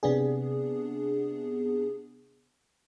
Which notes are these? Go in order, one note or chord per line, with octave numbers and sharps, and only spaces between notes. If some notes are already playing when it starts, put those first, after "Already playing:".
C3 B3 D4 G#4